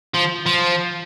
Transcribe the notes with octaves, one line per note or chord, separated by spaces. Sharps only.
F3
F3